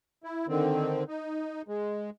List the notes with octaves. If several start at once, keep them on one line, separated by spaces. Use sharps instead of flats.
E4
D3 D#3 C4
D#4
G#3